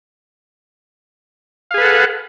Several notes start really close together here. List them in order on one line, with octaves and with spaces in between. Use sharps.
F5 G#4 B4 A4 F#5